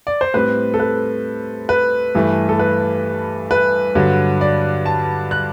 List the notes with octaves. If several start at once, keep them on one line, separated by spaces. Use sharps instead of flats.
D5
C5
A2 G3 C4 B4
A4
B4
B4
G2 E3 A3
A4
B4
B4
G2 D3 F#3
D5
A5
F#6